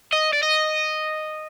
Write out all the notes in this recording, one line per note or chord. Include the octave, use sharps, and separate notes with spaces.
D#5
D5
D#5